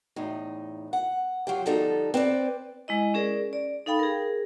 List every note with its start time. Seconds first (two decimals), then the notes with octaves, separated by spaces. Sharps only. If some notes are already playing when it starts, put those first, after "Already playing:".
0.16 E2 A2 D#4
0.93 F#5
1.47 F#3 F4 G4
1.66 D3 F3 G3 B3 D#4 A4
2.14 C4 B4 C5 D5
2.88 G#3 E4 D#5
3.14 C#4 G#4 A#4 D5
3.53 D5
3.86 D#4 A4 F5 G5 B5
3.99 G#4 A#4